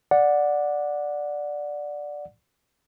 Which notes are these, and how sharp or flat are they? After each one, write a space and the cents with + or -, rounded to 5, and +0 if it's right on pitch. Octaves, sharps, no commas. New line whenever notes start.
D5 +0 F#5 -15